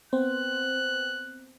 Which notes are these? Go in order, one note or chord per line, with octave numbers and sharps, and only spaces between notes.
B3 C4 C5 F#6